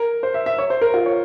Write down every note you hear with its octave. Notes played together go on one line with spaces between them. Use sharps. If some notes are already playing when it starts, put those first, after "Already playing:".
Already playing: A#4
C5
E5
E5
C#5
C5
A#4
F4
C#5